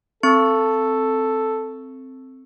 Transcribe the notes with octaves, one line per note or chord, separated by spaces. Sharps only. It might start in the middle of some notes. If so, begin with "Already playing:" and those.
C4 A4 C#6